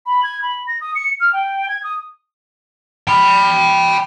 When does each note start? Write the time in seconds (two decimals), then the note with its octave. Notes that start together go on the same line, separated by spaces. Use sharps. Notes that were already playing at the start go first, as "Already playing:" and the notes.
0.06 B5
0.23 G#6
0.42 B5
0.67 A#6
0.81 D#6
0.95 C#7
1.20 F6
1.33 G5
1.69 G#6
1.84 D#6
3.08 G5 B5